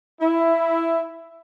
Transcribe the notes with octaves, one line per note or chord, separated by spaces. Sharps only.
E4